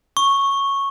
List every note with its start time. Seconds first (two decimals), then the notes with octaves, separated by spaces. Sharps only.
0.17 C#6